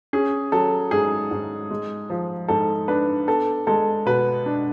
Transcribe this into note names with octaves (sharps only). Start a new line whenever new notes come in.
C#4 G#4
F#3 A4
G#2 G#4
G#2
G#3
F3
G#2 A4
D4 B4
B3 A4
G#3 A4
B2 B4
D4